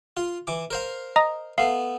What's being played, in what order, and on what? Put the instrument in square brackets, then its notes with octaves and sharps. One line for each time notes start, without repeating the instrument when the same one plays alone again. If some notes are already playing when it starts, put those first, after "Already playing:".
[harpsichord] F4
E3 D6
A#4 C5 F5
[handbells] D#5 A#5 D#6
[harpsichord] A3 B3 [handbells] F5